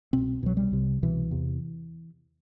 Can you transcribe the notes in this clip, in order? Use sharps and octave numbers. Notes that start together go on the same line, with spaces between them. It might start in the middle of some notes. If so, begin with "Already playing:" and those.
C2 B2 C4
C2 B2 F#3
G3
C2 C3
C2 B2 E3
E2 C3